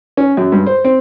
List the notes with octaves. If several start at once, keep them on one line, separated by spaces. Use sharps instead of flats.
C#4
F#2
G2
C5
C4